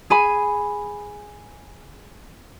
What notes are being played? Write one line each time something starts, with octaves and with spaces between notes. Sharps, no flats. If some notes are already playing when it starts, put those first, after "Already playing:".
G#4 G#5 B5